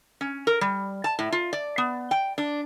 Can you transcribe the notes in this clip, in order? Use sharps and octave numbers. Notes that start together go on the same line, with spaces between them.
C#4
A#4
G3
A5
A2
F4
D5
B3
G5
D4